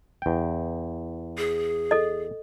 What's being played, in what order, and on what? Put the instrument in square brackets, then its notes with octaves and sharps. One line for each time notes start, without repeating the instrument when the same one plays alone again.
[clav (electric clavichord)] E2 G5
[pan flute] G#4
[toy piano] A4 D#5